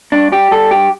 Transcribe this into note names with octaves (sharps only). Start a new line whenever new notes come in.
G2 D4
G3 G4
G3 A4
G2 G4